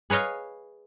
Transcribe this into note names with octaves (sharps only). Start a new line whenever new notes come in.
G#4 B4 C#5 D#5 F5